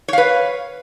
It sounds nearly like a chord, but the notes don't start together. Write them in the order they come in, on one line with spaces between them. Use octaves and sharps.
C#5 F5 B4